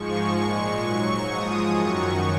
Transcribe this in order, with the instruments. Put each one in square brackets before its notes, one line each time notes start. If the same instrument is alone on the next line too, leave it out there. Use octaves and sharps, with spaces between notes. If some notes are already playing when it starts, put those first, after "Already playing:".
Already playing: [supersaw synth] G#2 F3 G#3 C#6
A#2 G#3
G#2 F#3
G#2 F3 G#3 D#6
F#2 D#3 F#3 C#6